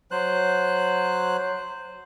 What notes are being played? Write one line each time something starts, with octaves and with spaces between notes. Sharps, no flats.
F#3 C5 F#6